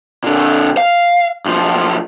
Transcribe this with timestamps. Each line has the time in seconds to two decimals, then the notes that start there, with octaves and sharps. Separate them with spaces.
0.24 A#2 D3
0.77 F5
1.45 B1 F3